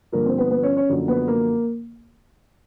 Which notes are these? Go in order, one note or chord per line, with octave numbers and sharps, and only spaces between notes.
G2 D3 F3 A#3 A#4
C4 C5
B3 B4
B3 B4
C#4 C#5
C#4 C#5
F#2 D3 F3 A#3
B3 B4
A#3 A#4